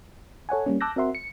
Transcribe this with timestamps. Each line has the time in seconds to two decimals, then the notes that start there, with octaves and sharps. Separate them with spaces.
0.49 A4 C#5 F#5 G#5
0.66 G3 A#3 C#4
0.81 A5 D6 E6 F#6 G6 A#6
0.96 C4 F#4 A#4 E5 F#5 C6
1.15 C#7